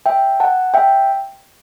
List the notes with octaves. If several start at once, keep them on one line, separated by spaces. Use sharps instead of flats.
E5 G5
F#5 A5
E5 G5